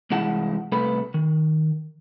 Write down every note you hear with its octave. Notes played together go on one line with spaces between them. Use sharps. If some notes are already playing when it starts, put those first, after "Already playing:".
C2 E3 G#3 E4 F#5 A5
C2 A3 A4 B4 B5
D#3